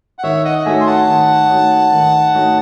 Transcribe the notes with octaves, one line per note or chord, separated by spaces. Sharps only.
F#5
D#3 C#5 E5
D#5 F#5
F#5
A3 D#4 F#4 C#5 E5 G#5
C6
F#5 A5
D#3
A3 D#4 F#4 C#5
D#3
A3 D#4 F#4 C#5